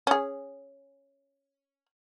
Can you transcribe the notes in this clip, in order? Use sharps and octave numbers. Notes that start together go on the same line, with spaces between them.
C#4 G#4